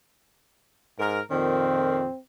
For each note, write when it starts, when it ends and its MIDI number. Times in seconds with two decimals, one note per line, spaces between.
0.99 1.20 44
0.99 1.20 70
1.31 2.05 41
1.31 2.05 46
1.31 2.05 51
1.31 2.19 60